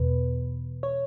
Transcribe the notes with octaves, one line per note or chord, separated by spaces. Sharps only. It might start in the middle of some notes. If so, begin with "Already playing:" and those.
Already playing: E2 B2 B4
C#5